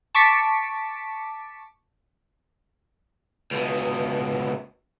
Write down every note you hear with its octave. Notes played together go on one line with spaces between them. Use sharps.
A5 C#6 D6 B6 C#7 D7
C#2 B2